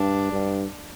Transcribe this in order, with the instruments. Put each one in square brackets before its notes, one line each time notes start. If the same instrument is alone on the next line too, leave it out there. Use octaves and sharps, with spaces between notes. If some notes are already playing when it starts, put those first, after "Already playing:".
Already playing: [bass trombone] G2 [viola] D4
[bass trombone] G2